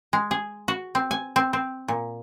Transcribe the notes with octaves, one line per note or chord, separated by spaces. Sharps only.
G#3
G#4
F#4
C4
G#5
C4
C4
A#2